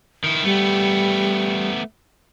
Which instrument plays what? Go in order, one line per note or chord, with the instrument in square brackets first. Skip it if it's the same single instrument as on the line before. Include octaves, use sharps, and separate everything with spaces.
[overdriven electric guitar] D#3 E4
[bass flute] G3 [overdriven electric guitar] A3 B3